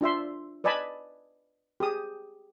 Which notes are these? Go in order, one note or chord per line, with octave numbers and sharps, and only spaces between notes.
D4 F4 E5 C6
B4 D5 D#5 G#5 A5 B5
G4 G#4 D#6